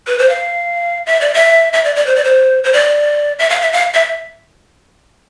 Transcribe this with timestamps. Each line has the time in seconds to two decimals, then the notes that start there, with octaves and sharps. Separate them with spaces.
0.07 B4
0.19 C5
0.29 F5
1.06 E5
1.21 D5
1.34 E5
1.73 E5
1.84 D5
1.96 D5
2.06 C5
2.16 D5
2.24 C5
2.64 C5
2.73 D5
3.39 E5
3.50 F5
3.61 E5
3.72 F5
3.94 E5